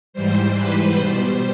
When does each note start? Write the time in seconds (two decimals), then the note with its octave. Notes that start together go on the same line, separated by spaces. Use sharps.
0.13 G#2 E3 G3 C5
0.55 B4
0.96 B2 G3 C5